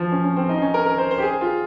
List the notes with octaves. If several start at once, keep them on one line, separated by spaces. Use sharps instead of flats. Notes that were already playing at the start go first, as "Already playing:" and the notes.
Already playing: F3
C#4
C#4
C4
D#4
C#4
A#4
A#4
C5
C5
G4
G#4
F4